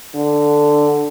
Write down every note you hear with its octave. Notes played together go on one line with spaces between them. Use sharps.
D3